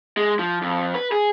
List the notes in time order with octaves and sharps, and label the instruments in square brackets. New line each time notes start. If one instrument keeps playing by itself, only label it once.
[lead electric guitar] G#3
F3
F2
B4
G#4